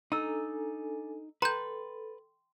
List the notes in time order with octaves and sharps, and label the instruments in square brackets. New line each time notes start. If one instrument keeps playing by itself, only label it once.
[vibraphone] D4 A4 G#5 [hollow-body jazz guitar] D#4 [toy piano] A#5 E6
[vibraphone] A4 [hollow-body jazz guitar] B4 [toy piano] G5 C6 [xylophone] A#5 G6